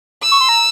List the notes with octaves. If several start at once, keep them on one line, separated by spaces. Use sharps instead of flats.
E6
C#6
C6
A#5